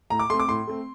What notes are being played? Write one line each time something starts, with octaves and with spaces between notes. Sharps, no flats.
A2 A#5
D6
A3 C4 C6
D6
A2 C6
A3 C4